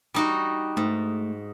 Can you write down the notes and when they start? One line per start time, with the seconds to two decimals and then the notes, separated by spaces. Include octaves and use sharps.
0.14 G3 D#4 F#4
0.77 G#2 A3